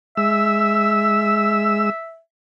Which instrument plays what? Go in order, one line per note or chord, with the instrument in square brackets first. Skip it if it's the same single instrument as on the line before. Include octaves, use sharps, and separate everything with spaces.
[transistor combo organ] G#3 E6 [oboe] E5